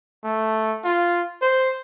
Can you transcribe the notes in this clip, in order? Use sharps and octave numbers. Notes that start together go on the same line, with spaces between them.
A3
F4
C5